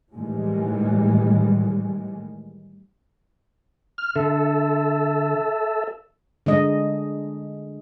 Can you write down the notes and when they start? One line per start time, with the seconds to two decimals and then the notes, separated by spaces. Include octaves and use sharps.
0.14 A2 D#3 E3 G3 G#3
3.98 F6
4.16 D3 A4 E5
6.46 D3 G#3 D#5